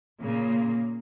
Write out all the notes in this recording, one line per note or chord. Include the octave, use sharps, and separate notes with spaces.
A#2 C#3 A#3